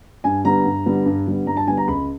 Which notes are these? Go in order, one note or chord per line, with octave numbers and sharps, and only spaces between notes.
G2 G#5
D3 G3 B3 A#5
G2
D3 G3 B3
G2
D3 G3 B3
G2 A#5
A5
D3 G3 B3 G#5
A#5
C#2 B5